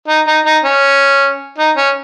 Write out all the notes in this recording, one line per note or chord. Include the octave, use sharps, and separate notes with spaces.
D#4
D#4
D#4
C#4
D#4
C#4